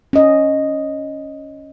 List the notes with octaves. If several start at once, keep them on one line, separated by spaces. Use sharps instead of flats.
C#4 D#5